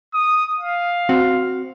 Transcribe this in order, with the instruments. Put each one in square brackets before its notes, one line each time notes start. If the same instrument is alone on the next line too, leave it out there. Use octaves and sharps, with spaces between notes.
[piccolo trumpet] D#6
F5
[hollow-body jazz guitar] C4 F#4 F#5